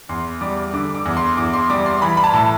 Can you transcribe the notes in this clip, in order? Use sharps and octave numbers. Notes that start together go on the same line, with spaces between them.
E2 C6
G3 D6
D3 D6
D6
E2
C6
E2 D6
C6
G3 D6
C6
E3 B5
B5
A5
A2